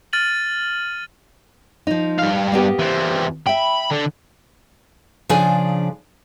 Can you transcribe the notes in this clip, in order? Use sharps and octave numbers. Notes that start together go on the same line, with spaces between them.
F6 A6 D#7 F#7
F3 D#4
G2 F5
A#3 B3 G4
E3 C4
E5 G5 B5
D3
C#3 F3 D4 G#4 G#5